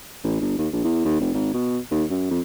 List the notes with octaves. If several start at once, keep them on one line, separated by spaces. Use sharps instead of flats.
A1
G1
D#2
A#1
E2
D#2
F1
G#1
B2
D#2
F#2
F2